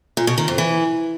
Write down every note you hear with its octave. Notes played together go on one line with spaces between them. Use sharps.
A#2
B2
D#3
F2
E3